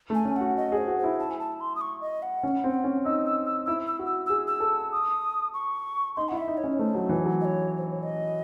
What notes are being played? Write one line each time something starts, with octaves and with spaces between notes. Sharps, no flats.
A3
G#5
C#4
F#4 F#5
D#5
G#4
C5
F#4
C5
E4
A5
G#5
A5
C6
D#6
C#6
D#5
F#5
C#4
C4
C#4
D#4 E6
E6
E6
E4 E6
E6
F#4
E6
G#4 E6
E6
A4
D#6
C#6
D#4 C6
E4 F#5
E5
D#4
C#5
C#4
A3 C5
F#3
E3
F#3
D#5
C#5
C5
C#5
D#5